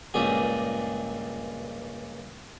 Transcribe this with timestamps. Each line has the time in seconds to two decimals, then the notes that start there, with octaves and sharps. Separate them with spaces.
0.14 C#2 G2 A#2 G4 G#4